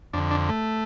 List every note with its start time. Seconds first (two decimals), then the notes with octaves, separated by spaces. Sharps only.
0.13 F2 D3 D4
0.31 D4
0.49 A3